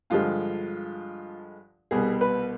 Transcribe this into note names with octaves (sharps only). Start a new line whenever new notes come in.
G2 D3 F3 G#3 F4
C2 B2 G3 B3 G#4
B4